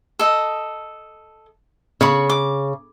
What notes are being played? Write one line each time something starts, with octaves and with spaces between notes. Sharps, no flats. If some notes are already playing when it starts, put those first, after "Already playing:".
A4 D#5
C#3 C#5 B5 C#6
D6